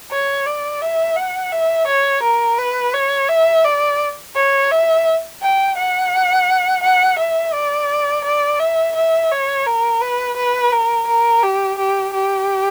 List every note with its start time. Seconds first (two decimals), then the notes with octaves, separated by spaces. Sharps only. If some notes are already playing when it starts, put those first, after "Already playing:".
0.11 C#5
0.46 D5
0.82 E5
1.16 F#5
1.52 E5
1.87 C#5
2.23 A#4
2.58 B4
2.94 C#5
3.29 E5
3.65 D5
4.36 C#5
4.71 E5
5.42 G5
5.77 F#5
6.83 F#5
7.19 E5
7.54 D5
8.24 D5
8.60 E5
8.95 E5
9.31 C#5
9.66 A#4
10.01 B4
10.37 B4
10.72 A#4
11.08 A#4
11.43 G4
11.79 G4
12.14 G4